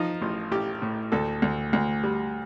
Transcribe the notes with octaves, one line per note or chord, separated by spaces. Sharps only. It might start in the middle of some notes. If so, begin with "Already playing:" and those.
Already playing: F3 D#4
A1
A1 G4
A2
D2 A4
D2
D2
G3